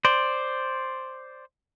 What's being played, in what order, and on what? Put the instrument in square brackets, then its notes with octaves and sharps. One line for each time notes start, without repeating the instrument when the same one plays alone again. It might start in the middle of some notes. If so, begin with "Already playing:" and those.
[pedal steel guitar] C5 D5